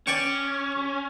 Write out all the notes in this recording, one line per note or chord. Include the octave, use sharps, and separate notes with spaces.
C#4 D5 G5 C#6